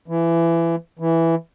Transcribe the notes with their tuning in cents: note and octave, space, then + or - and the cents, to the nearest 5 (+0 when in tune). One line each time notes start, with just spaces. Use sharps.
E3 +20
E3 +0